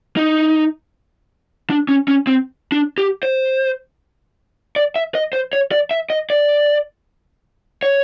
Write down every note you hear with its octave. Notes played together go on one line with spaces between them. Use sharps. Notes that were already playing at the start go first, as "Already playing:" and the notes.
D#4
D4
C#4
C#4
C4
D4
G4
C5
D5
E5
D#5
C5
C#5
D5
E5
D#5
D5
C#5